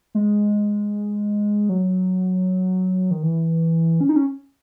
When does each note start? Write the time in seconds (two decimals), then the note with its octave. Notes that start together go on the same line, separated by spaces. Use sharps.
0.15 G#3
1.69 F#3
3.11 D#3
3.23 E3
4.01 C#4
4.09 D#4
4.16 C#4